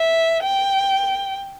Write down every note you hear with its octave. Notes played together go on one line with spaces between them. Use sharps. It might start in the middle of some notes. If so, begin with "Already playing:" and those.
Already playing: E5
G5